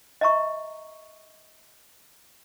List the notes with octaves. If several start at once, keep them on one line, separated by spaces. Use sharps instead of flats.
D#5 E5 A#5 C#6